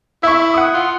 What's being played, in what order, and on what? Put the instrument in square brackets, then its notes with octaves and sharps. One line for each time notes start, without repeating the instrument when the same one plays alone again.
[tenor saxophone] E4 [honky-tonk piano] E5 C#6
[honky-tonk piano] F#5 D#6
[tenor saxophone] F4